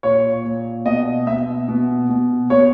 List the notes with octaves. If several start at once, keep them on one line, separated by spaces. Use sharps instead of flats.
A#2 C#5
A#2
B2 D#5
B2 E5
B2
B2
B2 C#5